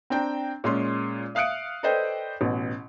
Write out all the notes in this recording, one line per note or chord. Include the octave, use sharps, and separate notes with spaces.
C4 D4 G5 A#5
A#2 G#3 C#4 F4 C6
E5 F5 D#6 F#6 C#7 D7
A4 B4 C5 D5 D#5 G5
A1 B2